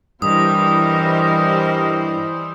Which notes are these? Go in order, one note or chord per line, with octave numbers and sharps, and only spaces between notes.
G2 E3 G3 G4 A#4 C5 D#5 D#6